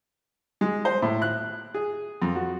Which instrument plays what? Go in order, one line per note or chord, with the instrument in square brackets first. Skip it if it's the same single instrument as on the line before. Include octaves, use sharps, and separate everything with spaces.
[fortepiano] G#3
C5
A2
F#6
G#4
F2
F#4